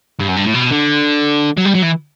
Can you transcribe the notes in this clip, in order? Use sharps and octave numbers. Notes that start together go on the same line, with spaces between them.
G2
F#2
G2
A2
B2
D3
F#3
G3
F#3
E3